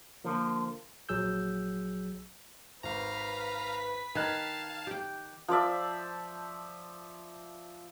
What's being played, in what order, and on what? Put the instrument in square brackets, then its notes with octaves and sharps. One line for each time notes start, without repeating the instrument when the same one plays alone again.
[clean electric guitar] D3 F3 [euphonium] A#3
[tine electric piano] A#1 F#3 G#4 E6 G6
[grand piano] G#1 [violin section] B4 B6 [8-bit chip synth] F5 A#5
[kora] D#3 [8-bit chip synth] F5 A5 [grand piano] F#6 G#6
[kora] G4 G5
[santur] F3 C5 D5 E5